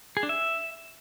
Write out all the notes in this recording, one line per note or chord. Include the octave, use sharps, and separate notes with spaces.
G#4
D4
E5